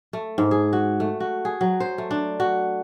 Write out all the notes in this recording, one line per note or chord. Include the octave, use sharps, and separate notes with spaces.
A3
G#2
G#4
F#4
A3
F#4
G#4
F#3
C5
A3
D4
F#4